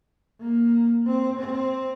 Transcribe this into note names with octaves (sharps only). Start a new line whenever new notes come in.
A#3
C4
C4